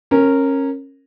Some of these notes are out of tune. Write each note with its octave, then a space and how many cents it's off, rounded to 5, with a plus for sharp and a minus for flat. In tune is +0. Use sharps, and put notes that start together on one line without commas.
C#4 -25 A#4 -10